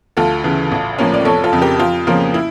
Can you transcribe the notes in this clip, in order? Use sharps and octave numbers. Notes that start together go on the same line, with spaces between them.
D2 F4 A4
C#3 E3
A1
A2 F3 A#3 C#4
D5
F1 A4 C#5
F4 A4
F2 C#3
G4 A#4
F2 F4
C#3 F3 A#3 C#4 F4
E4